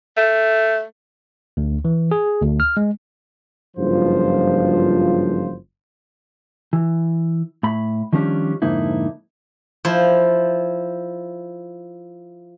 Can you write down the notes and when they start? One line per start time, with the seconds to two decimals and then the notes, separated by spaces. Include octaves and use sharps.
0.17 A3
1.57 D2
1.85 E3
2.11 G#4
2.41 D2
2.60 F6
2.77 G#3
3.77 F#1 G2 F3 F4 C5
6.73 E3
7.63 A2 B5
8.13 D#3 F3 G3 C#4 D4
8.62 F2 G#2 D3 A#3 D#4 E4
9.85 F3 E4